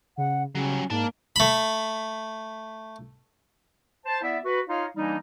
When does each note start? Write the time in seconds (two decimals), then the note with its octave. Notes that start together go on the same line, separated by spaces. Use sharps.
0.18 C#3 F#5
0.55 C#3 F#3 G3 C#4
0.90 G#2 A#3 D5 A5
1.36 A3 B5
4.06 C5 A5
4.22 B3 E4 D5 E5
4.45 F#4 B4
4.69 D#4 F4 C#5 D#5 F5
4.96 E3 G3 A#3 D4 D#4